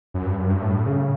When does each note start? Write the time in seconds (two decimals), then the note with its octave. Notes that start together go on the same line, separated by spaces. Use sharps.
0.14 F#2
0.26 G2
0.38 F#2
0.50 G2
0.62 A2
0.86 C#3